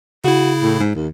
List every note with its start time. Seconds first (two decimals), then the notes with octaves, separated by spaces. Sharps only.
0.24 C#3 E4 F#4
0.62 A2
0.80 G#2
0.95 D#2